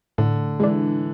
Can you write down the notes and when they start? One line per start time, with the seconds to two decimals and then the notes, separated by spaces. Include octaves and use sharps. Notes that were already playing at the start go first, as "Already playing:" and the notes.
0.18 A2 D3
0.60 E3 G#3 D4